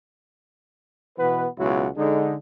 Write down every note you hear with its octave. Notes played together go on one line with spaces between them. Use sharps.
B2 E3 B3 B4
C#2 B2 F#3 G#3 E4 F#4
D3 G#3 D#4